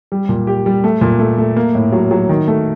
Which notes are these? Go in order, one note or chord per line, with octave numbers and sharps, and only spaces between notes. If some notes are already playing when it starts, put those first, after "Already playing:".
G3
A#2
G4
G3
A3
A#2
A3
A3
A#3
A2
F#3
F#3
D#3
A3